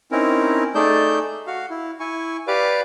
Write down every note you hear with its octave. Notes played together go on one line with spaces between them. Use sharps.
C4 C#4 D#4 E4 A#4
A3 D#4 G#4 D5 A5 G6
F#4 F5
E4
E4 G#5 C#6
G4 B4 D5 F5 D6